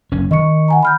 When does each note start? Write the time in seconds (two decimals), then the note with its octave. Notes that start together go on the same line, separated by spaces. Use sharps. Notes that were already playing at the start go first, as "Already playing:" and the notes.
0.12 F#1 C#4
0.31 D#3 D#5 C#6 C#7
0.68 F#5 G#5 A#5
0.83 B5 F6 G6